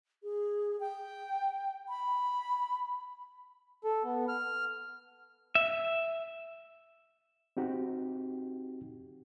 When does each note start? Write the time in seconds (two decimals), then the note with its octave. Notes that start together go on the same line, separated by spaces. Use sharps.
0.23 G#4
0.80 G5
1.89 B5
3.84 A4
4.04 B3
4.29 F6
5.55 E5
7.57 C4 D#4 F#4 G4